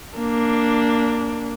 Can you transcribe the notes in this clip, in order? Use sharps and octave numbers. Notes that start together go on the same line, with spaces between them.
A#3 D4